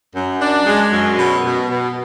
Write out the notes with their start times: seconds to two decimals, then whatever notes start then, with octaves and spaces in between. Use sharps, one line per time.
0.16 F#2
0.41 D4
0.67 G#3
0.92 F#2
1.18 B2
1.44 B2
1.70 B2